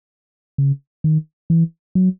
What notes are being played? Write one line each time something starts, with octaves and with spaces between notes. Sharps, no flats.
C#3
D#3
E3
F#3